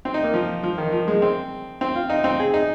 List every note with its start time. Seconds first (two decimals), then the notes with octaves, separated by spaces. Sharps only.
0.05 C4
0.14 D#4
0.24 A#3
0.34 F3
0.63 F3
0.78 D#3
0.92 F3
1.08 G#3
1.22 C4
1.81 C4
1.95 F4
2.10 D#4
2.24 C4
2.40 G#4
2.54 D#4